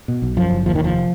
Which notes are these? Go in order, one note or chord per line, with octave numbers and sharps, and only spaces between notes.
B2
B1
F#2 F3
F#1
D#2 F3
D#3
F1 F3